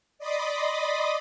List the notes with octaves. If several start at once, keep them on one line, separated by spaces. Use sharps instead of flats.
D5 D#5 B5 C6 D6 D#6